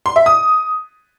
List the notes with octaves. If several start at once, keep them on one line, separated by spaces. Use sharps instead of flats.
C6
E5
D#6